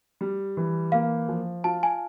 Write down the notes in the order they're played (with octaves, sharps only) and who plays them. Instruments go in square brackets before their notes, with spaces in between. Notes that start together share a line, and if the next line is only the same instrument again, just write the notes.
[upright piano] G3
E3
[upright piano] A#3 [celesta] F5
[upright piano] F3
[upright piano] F4 [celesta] A5
[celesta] G#5